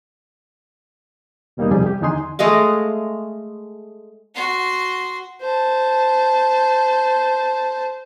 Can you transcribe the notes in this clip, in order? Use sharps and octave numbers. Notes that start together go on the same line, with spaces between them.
D#2 B2 G3 A#3 B3 D#4
C2 F2 C3 G3 G#4 G#5
G4
E2 D3 D4 D#4 G#5 C6
G#3 A3 D#5 F5
F#4 C6
C5 A5